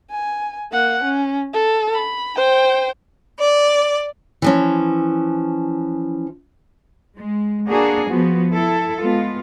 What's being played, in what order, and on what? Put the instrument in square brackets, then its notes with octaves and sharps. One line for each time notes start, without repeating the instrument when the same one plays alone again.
[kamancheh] G#5
A#3 F#5
C#4
A4
B5
C5 G5
[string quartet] D5
[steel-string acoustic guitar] E3 F3 C#4
[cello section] G#3
A#3 D4 F#4 G#4
F3 B3 F#4
E4 A4
G#3 B3 F4